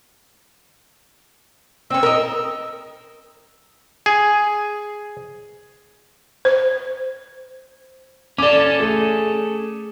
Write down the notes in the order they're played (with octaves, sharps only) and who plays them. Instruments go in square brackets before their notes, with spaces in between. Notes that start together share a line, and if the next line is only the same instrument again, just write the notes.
[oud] C4 C#4 [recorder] E6
[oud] A#4 D#5
[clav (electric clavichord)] G#4
[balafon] C5
[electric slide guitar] C#4 A4 [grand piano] D5 D6
[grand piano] A3 G#4